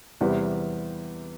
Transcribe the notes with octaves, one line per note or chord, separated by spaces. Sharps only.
E2 C3 G3 B3